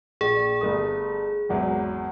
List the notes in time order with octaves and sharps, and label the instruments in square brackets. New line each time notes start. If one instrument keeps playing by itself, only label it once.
[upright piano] A#1 [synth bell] G#4
[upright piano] G1 A3 D#6
G#1 E2 F#3